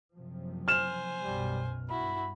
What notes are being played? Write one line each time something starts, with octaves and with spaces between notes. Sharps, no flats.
F#1 C3 F3
C5 G#5 F6 E7
B1 F#2 B2 G3
G2 E4 F#4 B5